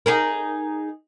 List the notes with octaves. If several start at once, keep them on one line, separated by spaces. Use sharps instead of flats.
D#4 G#4 A#4